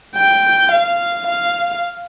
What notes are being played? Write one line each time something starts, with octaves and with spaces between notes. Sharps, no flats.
G5
F5
F5